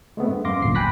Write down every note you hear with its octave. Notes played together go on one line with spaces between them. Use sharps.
G#3 A3 B3 C4
G2
F#2 F5 C6 D6 A#6
G1 D#2 A#2 C7
G5 G#5 B5 F#6 A#6 B6